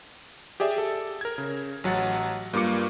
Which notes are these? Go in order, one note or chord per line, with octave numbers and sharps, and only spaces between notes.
G4 G#4 D5 E5
A4
A#4 G#6
C#3
A1 F#3 F#5 A6
G2 A#3 F4 D6 C#7